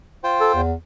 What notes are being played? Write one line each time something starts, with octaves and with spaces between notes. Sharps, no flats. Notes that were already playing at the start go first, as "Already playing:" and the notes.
F4 C5 G5
A4
E2